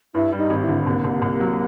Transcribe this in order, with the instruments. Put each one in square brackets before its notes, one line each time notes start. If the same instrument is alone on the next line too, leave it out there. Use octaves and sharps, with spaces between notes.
[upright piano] G2 [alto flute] E4
[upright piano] G3
[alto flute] D#4
[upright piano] G#1
[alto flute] E4
[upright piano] D3
[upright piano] C2 [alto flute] A#3
[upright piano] C2
C2
F#3